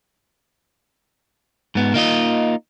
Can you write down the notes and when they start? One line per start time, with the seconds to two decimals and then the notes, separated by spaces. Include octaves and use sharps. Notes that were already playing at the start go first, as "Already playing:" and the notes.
1.75 G#2 B3
1.94 A#3 D#4 F4 D#5